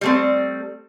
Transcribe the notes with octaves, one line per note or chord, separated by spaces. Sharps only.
G3 A3 C4